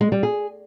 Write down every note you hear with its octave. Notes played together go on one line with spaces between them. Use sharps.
G#3
G3
G#4